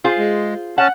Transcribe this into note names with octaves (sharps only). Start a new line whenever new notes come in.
F4 G#4 C5
G#3
C#4 F#5 A5